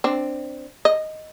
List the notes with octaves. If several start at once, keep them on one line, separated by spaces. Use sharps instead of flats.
C4 D4
D#5